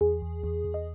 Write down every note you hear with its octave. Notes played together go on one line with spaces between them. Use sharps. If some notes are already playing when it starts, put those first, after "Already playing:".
E2 G#4
E2
E2
E2
D#5